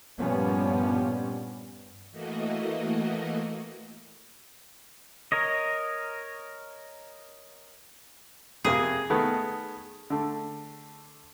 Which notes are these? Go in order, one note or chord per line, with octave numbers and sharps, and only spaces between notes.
G2 A#2 F3 G3 B3 C#4
E3 A3 A#3 F#4 D#5
A#4 C#5 D#5
F2 C3 A#3 G#4
D#3 A3 B3
D3 A3